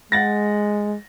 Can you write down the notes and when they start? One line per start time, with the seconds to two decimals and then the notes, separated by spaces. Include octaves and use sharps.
0.12 G#3 F#5 A6 A#6